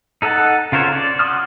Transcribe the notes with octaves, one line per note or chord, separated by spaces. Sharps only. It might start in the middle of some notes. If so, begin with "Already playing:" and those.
D#4 A4 D#5 F#5 A5
C#3 F4 A#4 C5 C#5
D5
F#4 C6 D#6 F6